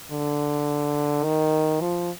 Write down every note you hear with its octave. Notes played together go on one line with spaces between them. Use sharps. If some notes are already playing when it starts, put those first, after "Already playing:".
D3
D#3
F3